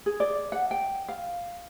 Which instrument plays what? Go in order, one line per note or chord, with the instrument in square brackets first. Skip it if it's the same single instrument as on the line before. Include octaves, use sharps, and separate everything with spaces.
[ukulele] G#4
D5
F#5
G5
F5